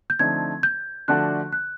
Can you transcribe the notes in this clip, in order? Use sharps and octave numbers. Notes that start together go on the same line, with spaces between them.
G6
D3 F3 A3 C4 D#4 G#6
G6
D3 F3 A3 D4 F#4 F#6
F#6